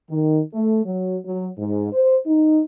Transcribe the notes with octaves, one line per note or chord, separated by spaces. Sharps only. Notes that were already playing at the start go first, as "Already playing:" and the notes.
D#3
A3
F#3
F#3
G#2
C5
D#4